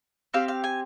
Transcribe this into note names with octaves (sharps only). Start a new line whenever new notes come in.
C4 G4 F5
F5
G#5